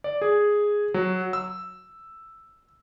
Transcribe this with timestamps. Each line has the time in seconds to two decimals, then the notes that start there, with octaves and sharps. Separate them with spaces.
0.04 D5
0.22 G#4
0.94 F#3
1.33 E6